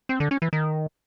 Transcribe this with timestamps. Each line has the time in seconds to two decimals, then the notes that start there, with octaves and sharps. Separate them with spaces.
0.09 C4
0.20 D3
0.31 C#4
0.42 E3
0.53 D#3